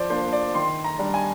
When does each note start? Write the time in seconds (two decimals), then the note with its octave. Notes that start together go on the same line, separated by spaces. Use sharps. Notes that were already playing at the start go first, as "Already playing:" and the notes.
Already playing: F3 C5 D5
0.10 A#3 D4 C5
0.33 D5
0.54 D#3 C6
0.84 A#5
0.99 G3 D4
1.14 G#5